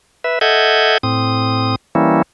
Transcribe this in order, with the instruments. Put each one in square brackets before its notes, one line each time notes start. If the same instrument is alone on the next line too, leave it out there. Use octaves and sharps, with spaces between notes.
[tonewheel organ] B4 E5
A4 D#5 E5 F#5 G6 G#6
A2 C4 D#6
E3 G3 A#3 C#4 E4